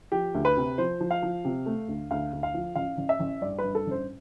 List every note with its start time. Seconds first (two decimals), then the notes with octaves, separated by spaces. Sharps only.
0.12 F3 G4
0.34 D2
0.45 B4
0.57 C3
0.78 F3 C5
1.00 F3
1.11 F5
1.23 F3
1.45 C3
1.66 A3
1.88 D2
2.11 D2 F5
2.33 D2
2.43 F5
2.54 F3
2.76 A1 F5
2.97 A1
3.09 E5
3.20 A1
3.41 G2 D5
3.59 G2 B4
3.75 A4
3.86 A1 C5